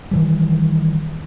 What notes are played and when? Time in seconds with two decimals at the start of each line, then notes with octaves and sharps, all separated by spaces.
0.11 D#3 E3 G3